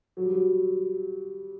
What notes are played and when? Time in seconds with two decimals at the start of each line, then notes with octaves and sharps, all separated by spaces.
0.17 F#3
0.24 G3
0.32 F#3